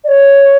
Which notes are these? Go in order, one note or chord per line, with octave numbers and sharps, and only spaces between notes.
D5
C#5